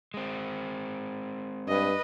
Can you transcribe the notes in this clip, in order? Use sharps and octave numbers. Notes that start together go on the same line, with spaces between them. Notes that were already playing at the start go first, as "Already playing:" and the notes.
G#3 C4
G2 B4 D#5